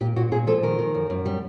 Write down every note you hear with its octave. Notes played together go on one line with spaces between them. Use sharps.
A#2 G4
A#2 F#4
A#2 G#4
F3 A4
D#3 A#4
D#3
F#2
F#2
G3